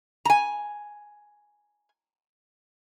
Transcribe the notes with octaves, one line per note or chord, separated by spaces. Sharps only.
G#5 A#5